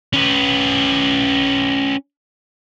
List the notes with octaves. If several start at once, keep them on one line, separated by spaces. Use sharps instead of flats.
C#4 B4